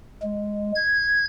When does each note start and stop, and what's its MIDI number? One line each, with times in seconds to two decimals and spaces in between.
0.23 0.72 56
0.75 1.25 92